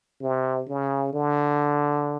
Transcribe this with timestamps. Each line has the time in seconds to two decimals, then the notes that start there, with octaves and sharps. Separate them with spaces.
0.21 C3
0.68 C#3
1.13 D3